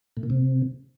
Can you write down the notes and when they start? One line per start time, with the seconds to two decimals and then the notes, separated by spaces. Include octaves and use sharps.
0.17 A2
0.23 A#2
0.30 C3